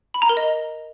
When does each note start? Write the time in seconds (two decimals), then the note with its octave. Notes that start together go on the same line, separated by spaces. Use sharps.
0.14 B5
0.22 A#5
0.29 A#4
0.37 D#5